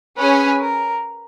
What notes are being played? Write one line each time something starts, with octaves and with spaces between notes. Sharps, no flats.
C#4 G#4 B4 C#5 G#5
A#4